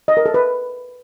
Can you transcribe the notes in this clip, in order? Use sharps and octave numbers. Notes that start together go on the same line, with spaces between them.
D#5
A#4
A4
B4